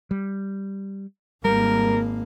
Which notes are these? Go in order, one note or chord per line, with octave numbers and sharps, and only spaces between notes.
G3
G#1 G3 A#3 A#4